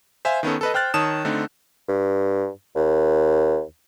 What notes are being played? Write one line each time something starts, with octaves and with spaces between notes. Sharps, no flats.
C5 E5 F5 G#5
D#3 B3 C#4 A4
A4 B4 D#5
C5 G5 F6 F#6 A6
D#3 C#5 A5 D#6 E7
D3 A3 C4 D#4
G2
D#2